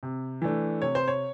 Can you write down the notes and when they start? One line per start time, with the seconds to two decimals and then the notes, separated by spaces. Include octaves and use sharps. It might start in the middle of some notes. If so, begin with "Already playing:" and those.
0.03 C3
0.42 E3 A3 D4
0.82 C3 C#5
0.95 C5
1.08 C#5